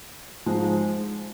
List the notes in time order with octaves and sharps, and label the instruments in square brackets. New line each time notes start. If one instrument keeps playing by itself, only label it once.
[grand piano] G#2 F3 G#3